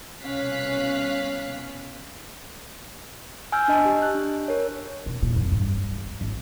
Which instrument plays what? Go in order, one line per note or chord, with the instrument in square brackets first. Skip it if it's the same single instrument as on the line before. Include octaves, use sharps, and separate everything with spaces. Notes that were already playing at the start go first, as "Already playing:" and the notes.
[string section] C2 B2 C#4 F5 F#6 B6
[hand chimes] G#5 E6 F6 G6
D4 D#5 A5
G4
F#6
D4
A#4 C#5
[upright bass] B2
A#2
F2
G2
G#2
G#1